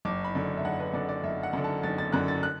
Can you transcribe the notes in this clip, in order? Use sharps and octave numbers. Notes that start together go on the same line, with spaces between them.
F#1 D6
B5
F#2 D3
E5
F#1 F#5
B4
F#2 D3 D5
D5
F#1 E5
F#5
F#2 D3
A5
F#1 A6
A6
F#2 D3 F#6
A6
F#6